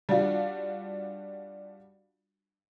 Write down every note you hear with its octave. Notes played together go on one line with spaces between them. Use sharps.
G3 D4 F4 F#4